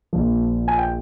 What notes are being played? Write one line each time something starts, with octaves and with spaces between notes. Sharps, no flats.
A#1 A#2 F3
G#5
G5